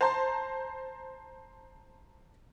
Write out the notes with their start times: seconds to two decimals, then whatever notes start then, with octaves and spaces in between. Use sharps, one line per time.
0.01 C5 A5 A#5 C6